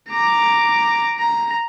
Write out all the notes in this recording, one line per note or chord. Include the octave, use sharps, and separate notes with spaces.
A#5 D6
A#5